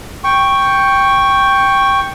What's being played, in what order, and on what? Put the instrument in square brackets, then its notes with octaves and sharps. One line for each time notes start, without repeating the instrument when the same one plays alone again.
[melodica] G5 C#6